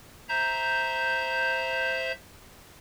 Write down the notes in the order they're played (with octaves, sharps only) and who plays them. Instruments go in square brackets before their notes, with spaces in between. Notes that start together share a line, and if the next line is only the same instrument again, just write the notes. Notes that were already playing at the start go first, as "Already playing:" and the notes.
[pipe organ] C5 E5 A#5 G6